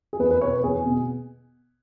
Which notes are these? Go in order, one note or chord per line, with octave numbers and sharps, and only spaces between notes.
G#4
E2 B4
B4
B2 B3 C#5
B4
E2 G#4
B2 B3